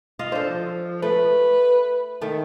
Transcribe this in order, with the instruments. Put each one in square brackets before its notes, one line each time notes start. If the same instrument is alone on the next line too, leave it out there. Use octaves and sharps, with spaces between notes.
[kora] F4 D#5 F5
[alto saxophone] D4 [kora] A4 C5
[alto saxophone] F3
[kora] A3 [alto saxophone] B4
[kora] D#3 A3